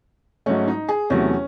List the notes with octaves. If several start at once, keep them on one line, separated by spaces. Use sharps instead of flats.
G#2 F#3 A3 C#4
D#4
G#4
E2 C3 F#3 A3 C#4